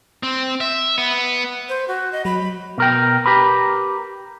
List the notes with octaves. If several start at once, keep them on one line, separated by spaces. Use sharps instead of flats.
C4
E5
B3
C5
F#4
D#5
F#3 B5
B2 A#4 G5
G4 A#4 B4